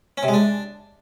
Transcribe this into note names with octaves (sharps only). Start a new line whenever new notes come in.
C#4
C3
G#3
D4